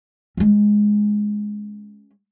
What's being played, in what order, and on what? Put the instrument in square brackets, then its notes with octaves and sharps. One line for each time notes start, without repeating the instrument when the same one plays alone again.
[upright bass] G#3 C#4